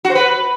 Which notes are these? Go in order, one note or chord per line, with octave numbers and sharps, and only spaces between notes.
F#4
C5
B4